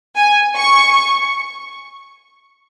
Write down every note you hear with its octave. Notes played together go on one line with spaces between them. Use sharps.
G#5
C#6